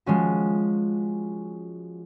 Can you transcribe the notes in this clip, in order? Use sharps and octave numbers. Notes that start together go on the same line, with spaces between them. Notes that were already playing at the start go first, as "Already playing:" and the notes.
F3 G#3 C#4 F#4